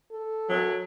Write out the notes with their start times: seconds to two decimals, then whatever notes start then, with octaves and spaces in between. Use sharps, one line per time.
0.12 A4
0.49 F#3